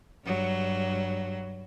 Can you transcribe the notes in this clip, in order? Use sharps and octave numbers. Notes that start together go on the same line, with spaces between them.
G2 F#3